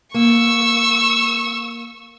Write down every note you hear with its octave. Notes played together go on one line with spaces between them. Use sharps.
A#3 C#6 E6